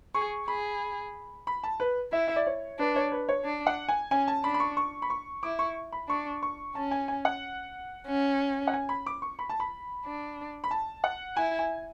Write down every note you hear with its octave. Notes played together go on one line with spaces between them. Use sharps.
G#4 C#6
G#4 B5
B5
A5
B4
E4 E5
E5
D5
C#5
D4 B4
C#5
B4
C#5
D4
F#5
G#5
C#4 G#5
A5
D4 B5
B5
C#6
C#6
B5
C#6
E4 D6
C#6
B5
D4 C#6
C#6
C#4 A5
G#5
G#5
F#5
C#4
F#5
G#5
B5
D6
C#6
B5
A5
B5
D4
B5
A5
F#5
E4 G#5
G#5